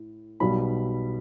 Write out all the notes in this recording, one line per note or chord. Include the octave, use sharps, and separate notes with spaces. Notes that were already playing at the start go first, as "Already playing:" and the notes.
Already playing: A2
B1 B2 G3 B5